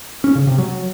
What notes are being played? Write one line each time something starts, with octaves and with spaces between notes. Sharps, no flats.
C#4
C#3
C3
F#3